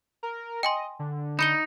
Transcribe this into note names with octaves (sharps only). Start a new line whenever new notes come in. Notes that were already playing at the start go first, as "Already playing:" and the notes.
A#4
D#5 G5 G#5 C6
D3
D#4 B5 C#7 G7